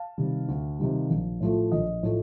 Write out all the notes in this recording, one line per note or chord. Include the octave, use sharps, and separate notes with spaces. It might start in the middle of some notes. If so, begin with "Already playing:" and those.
Already playing: F5 A5
C3 D#3 G3
D2
C3 D#3 G3
A#1
A2 F3 A3
A#1 D#5
A2 F3 A3